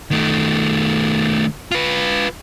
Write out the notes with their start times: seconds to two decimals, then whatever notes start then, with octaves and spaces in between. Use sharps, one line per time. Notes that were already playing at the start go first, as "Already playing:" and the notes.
0.11 D#3 A3
1.72 F4 B4